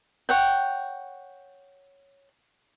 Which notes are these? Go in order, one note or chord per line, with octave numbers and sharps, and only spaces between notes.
C#5 F#5 G5